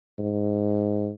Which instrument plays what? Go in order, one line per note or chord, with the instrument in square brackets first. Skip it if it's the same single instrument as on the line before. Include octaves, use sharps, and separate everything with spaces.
[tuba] G#2